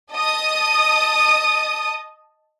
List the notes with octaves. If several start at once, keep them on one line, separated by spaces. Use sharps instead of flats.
D#5 A5 D#6